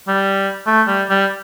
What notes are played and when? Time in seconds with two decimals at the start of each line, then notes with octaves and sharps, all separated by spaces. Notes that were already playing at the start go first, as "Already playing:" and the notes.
0.08 G3
0.67 A3
0.88 G3
1.10 G3